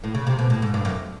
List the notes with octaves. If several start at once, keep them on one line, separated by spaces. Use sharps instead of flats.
A2
C#3
C3
B2
A2
G#2
G2
F#2